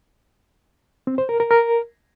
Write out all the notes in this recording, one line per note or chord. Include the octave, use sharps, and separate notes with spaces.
C4
C5
A#4
A#4
A#4